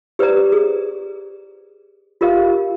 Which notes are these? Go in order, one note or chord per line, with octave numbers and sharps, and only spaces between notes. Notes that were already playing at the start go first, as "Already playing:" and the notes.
G4 B4 C5 D5 A#5
G#4
F4 G4 A#4 D#5 F5